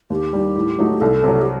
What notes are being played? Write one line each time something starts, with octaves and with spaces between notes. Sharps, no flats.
D#2 G4
D#3 G3
A2
F#3 A3 D#4 F#4
C2 A4
C3 F#3
G4